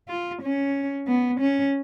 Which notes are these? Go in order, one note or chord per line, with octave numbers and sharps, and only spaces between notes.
F4
C#4
B3
C#4